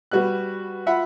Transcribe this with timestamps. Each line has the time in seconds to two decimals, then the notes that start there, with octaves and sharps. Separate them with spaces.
0.11 G3 F#4 B4 F#6
0.86 F4 E5 F#5 B5